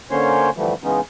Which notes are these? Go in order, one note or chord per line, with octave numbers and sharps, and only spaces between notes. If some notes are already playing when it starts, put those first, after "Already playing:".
D3 A#3 C#4 C5 C#5 C6
D3 E3 F3 G3 A3
C#3 E3 G#3 B3 C#4 D#4